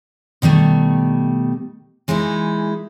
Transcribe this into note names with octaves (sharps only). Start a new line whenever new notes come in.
B2 D#3 G3 A3
E3 G#3 A#3 D#4 E4